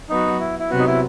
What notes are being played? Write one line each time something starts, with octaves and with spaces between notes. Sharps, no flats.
F#3 B3 D#4 F#4
E4
E4
C3 F#3 B3 F#4
D#4
E4